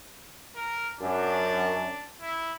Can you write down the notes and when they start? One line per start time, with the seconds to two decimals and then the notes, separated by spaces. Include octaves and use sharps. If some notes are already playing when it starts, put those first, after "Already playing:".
0.55 A#4
1.01 F#2 D4
2.21 E4